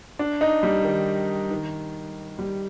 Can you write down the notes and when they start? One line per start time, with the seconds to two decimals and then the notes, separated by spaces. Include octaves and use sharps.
0.19 D4
0.41 D#4
0.63 G3
0.84 D#3
1.51 D#3
2.39 G3